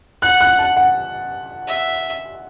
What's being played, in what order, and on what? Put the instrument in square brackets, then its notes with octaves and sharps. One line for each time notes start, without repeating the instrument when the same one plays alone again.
[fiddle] F#5 [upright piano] F#6
[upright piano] F#6
A5
F#5
[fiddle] E5